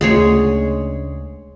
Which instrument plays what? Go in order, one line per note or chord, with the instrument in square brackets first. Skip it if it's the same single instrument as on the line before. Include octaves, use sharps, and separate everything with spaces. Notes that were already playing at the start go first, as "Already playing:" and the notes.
[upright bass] D2 C#3 [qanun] G#3 G#4 C#5